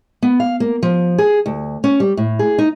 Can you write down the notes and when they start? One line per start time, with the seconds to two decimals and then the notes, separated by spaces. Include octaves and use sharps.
0.23 B3
0.40 F5
0.60 A#3
0.83 F3
1.18 G#4
1.46 D2
1.84 C#4
2.00 G3
2.17 A2
2.39 G#4
2.59 D#4